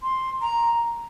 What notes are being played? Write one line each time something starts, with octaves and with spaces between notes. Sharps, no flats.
C6
A#5